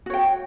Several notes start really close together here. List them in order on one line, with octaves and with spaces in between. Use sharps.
F#4 C#5 G5